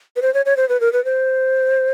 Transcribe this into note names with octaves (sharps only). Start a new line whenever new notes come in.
B4
C5
C#5
C#5
C5
B4
A#4
B4
C5